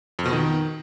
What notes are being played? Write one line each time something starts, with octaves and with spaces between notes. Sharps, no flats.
F2
B2
D#3